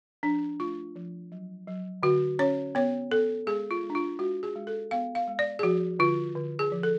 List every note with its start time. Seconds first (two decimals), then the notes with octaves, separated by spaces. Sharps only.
0.23 F3 D4
0.60 A3 F4
0.96 F3
1.32 F#3
1.68 F#3
2.03 D3 F#4
2.39 C#4 C#5
2.75 B3 C#5
3.11 B3 A4
3.47 G#3 G#4
3.71 F4
3.83 G#3
3.90 D4
3.95 F4
4.19 G#3 F#4
4.43 G#4
4.55 G#3
4.67 A4
4.91 B3 F5
5.15 F5
5.27 G#3
5.39 D5
5.59 G#4
5.63 F3 F#4
5.99 D3 F4
6.35 D3
6.59 G#4
6.72 F3
6.83 A4